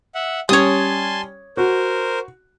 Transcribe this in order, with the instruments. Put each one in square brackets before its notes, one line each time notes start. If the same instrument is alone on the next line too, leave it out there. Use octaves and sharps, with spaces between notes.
[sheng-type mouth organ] E5 F#5
[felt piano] G3 C#4 [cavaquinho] C#5 D#6 [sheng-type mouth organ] G#5 A5 C6
[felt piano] F#4 [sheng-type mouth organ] A#4 C5